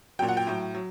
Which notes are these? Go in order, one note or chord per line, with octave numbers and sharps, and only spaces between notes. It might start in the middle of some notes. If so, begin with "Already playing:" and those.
A#2 F#3 G5
F#5
G5
A2 F#3
F#3